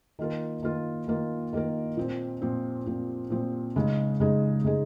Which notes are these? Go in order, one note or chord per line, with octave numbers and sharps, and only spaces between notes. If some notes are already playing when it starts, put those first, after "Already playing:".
D#3 A#3 F4 A#4
D#3 A#3 F4 A#4
D#3 A#3 F4 A#4
D#3 A#3 F4 A#4
A#2 F3 C4
A#2 F3 C4
A#2 F3 C4
A#2 F3 C4
C#3 G#3 D#4 G#4
C#3 G#3 D#4 G#4
C#3 G#3 D#4 G#4